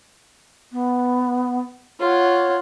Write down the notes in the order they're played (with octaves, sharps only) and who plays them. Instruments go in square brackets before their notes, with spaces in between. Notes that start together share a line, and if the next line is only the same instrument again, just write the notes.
[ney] B3
[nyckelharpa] F4 F#5 [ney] C#5